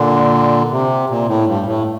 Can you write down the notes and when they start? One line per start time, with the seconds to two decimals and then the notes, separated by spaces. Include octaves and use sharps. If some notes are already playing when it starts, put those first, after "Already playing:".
Already playing: A#2 D3
0.72 C3
1.10 A#2
1.28 A2
1.47 G2
1.66 A2